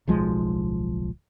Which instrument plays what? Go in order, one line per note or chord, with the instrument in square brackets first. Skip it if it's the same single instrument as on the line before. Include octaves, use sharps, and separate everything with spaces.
[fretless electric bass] D1 B1 F3 G#3